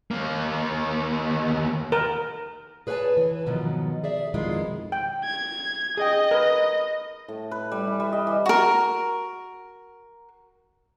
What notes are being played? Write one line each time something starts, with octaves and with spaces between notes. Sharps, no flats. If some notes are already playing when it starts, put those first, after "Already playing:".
D#2 A#3
A#4
G#4 B4 C#5 E5 G#5 A5
E3
G#2 B2 D#3 F3 F#3
G#4 D5 E5
F2 B2 D#3 G#3 E4 F4
G5
G#6
G#4 D#5 G5
A#4 B4
A2
B4
G3
E3
G3
D#5
E3
F#4 A#4